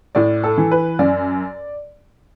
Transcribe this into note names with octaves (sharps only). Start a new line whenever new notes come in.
A2 D5
A4
E3
B4
F#2 D5